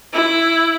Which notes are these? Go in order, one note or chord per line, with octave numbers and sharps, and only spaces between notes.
E4